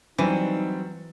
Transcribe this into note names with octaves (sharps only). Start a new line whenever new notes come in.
E3 F#3 G3 C4 D#4